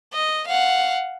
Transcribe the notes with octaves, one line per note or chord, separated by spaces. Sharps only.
D#5
F5 F#5